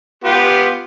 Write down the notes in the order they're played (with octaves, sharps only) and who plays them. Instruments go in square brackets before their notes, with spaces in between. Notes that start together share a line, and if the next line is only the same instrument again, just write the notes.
[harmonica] B3 F4 G4